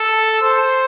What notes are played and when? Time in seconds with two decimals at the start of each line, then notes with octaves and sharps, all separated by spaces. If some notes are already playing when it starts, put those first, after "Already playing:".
Already playing: A4
0.42 C5